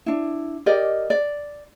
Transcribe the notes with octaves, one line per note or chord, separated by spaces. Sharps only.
D4 E4
G4 A#4 D5 D#5
D5